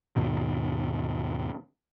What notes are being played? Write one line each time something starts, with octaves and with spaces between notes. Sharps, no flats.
D#2 G#2 B2 D#3